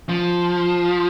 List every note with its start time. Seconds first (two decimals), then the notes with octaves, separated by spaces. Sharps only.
0.09 F3